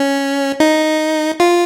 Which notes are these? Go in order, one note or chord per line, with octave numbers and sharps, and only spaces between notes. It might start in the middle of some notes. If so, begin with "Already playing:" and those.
Already playing: C#4
D#4
F4